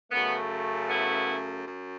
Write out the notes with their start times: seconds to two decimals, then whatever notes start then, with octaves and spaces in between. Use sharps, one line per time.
0.11 F#2 C#3 A3 B3
0.89 B3 E4
1.66 F#2